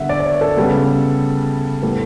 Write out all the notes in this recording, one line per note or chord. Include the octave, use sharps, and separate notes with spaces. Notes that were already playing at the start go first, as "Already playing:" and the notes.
Already playing: D3 G3 B3 E5 F#5
D5
D5
C#5
A4
C#3 G3 B3
A2 G3 B3 A4